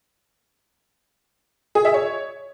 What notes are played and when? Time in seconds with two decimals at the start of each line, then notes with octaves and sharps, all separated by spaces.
1.75 G#4
1.85 E5
1.94 C#5